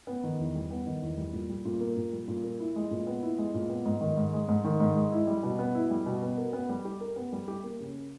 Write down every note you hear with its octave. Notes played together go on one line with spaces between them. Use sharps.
B3
D#3
E2
G3
B3
D#3
E2
G3
A#2
G3
A#2
A#3
A#2
G3
A#2
A#3
E4
G#3
A#2
B3
E4
G#3
A#2
B3
G#2
D#3
G#2
G#3
G#2
D#3
G#2
G#3
E4
G3
B2
B3
E4
G3
B2
B3
A#4
B3
G3
G4
A#4
B3
G3
G4
A#3
C#3